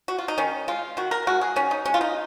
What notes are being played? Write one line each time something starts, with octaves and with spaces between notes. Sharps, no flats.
F#4
F4
D#4
D#3 C#4
G#3 F4
D#3 F#4
A#4
G#3 F#4
G#4
D#3 C#4
D#4
G#3 C#4
F4
D#4